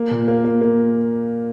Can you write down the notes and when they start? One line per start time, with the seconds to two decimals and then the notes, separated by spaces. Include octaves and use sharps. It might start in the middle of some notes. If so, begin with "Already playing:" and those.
Already playing: A#3
0.11 A#2
0.28 A#3
0.44 A#3
0.61 A#3